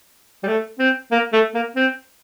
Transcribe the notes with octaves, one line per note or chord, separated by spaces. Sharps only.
G3
A3
C4
A#3
A3
A#3
C4